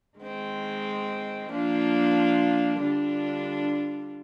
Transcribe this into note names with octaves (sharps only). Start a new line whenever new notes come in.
D#3 G#3 C4
F3 A#3 D4 F4
D3 G3 D4 F4